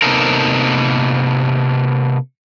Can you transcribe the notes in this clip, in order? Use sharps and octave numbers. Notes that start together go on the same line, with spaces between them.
C3 A#3 B3 D#4 A4 A#4